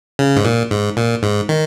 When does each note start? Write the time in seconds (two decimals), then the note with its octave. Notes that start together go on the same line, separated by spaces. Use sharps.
0.19 C#3
0.36 G#2
0.45 A#2
0.71 G#2
0.97 A#2
1.23 G#2
1.49 D#3